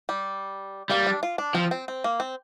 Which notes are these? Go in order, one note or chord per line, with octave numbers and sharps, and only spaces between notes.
G3
G3 A#3
D4
F4
D4
F3 C4
C4
C4
A#3
C4